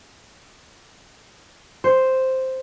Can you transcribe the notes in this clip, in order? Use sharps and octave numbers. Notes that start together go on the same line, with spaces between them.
C5